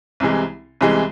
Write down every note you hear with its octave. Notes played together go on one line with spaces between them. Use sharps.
C2 C3 E3 G#3
C2 C3 E3 G#3